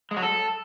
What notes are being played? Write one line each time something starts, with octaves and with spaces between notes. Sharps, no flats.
G#3
F#3
A4